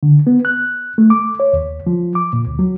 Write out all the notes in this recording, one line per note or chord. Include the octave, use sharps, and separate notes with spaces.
D3
B3
F#6
A3
D6
C#5
D#2
F3
D6
A#2
D2
F#3